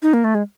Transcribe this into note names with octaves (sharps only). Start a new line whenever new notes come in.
D#4
A#3
A3
G#3